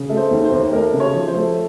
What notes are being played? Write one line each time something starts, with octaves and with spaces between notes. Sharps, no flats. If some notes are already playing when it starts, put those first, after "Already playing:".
Already playing: C#3
A3
C5
D#2
C5
D#2
A3 A#4
C#3
C#5
F3
C5
A3